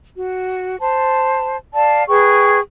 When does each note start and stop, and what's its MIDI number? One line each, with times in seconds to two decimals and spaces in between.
0.15 0.77 66
0.80 1.56 72
0.80 1.56 81
1.73 2.04 74
1.73 2.04 77
1.73 2.04 81
2.08 2.59 68
2.08 2.59 71
2.08 2.59 79
2.08 2.59 85